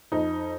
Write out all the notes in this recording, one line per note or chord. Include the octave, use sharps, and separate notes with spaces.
F2 D#4